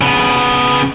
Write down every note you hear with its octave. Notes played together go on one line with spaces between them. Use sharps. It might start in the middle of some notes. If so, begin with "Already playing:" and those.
C#3 B3